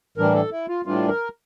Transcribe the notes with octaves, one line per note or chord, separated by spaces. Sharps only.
A2 E3 G3 D4 A#4
A4
E4
F4
A2 E3 G3 D4 F4
A#4